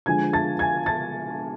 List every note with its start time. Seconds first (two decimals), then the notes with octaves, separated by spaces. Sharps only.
0.06 D3 F3 G#3 G#5 G#6
0.33 A5 A6
0.59 G#5 G#6
0.86 A5 A6